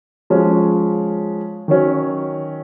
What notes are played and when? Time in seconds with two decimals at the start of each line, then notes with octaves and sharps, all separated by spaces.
0.30 F3 G#3 C#4
1.68 D#3 F#3 C#4